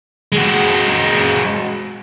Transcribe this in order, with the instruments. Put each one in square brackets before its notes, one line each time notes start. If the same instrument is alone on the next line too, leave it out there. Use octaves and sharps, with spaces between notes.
[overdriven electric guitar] G#3 F#4